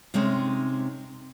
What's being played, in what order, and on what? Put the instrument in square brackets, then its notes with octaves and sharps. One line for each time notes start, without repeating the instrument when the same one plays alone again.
[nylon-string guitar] C3 G#3 C4 C#4 D#4